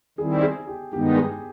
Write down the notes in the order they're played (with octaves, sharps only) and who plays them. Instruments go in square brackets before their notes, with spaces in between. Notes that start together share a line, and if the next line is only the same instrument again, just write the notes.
[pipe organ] D#3 G3 C4 E4 [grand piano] G#4
[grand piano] G#4
G4
[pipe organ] G2 D#3 G#3 B3 D#4 [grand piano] G4
[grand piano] G#4